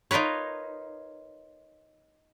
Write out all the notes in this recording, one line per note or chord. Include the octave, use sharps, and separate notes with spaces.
D#4 F4 A#4 B4 C#5